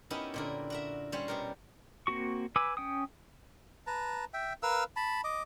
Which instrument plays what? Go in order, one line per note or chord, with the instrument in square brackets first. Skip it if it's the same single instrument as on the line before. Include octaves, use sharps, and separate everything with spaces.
[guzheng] B3 C#4 D#4 E4 G4 A#4
A#2 D3 A#4
F#4 A#4 E5
G3 C#4 C5 C#5
B2 G4 A#4
[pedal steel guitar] A#3 C4 F#4 C#6
B4 G#5 B5 D6 E6
C#4 G5 D#6
[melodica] B4 A5 A#5
E5 G5
A#4 B4 F5 E6
A5 B5
D#5 D6